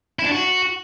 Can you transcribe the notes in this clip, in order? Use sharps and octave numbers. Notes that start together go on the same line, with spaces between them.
E4
D4
F#4